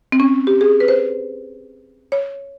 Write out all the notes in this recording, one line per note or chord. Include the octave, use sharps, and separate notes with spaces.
C4
C#4
G4
G#4
B4
C5
C#5